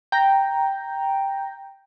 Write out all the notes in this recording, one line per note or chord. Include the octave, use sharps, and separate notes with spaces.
G5 A#5